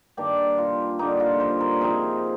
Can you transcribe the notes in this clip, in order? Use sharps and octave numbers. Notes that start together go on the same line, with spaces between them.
G2 D#3 A#3 D4 G4
F4
D3 G3 A#3 D#4
F4
C5
A#4
C3 F3 C4 D#4 G#4